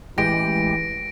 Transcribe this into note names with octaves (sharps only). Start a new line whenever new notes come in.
A1 E3 G#3 G4 A#6 D7